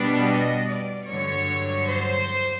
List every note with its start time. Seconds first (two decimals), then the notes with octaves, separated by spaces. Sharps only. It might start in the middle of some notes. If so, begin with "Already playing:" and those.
Already playing: B2 G3 B3 D4 D5
0.28 D#5
0.69 D5
1.09 G2 D3 F#3 C#5
1.90 C5